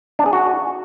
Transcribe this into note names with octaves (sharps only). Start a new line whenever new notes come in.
D4
G#4
F#4